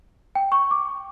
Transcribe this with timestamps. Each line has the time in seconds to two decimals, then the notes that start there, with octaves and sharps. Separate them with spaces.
0.35 G5
0.52 C#6
0.71 D6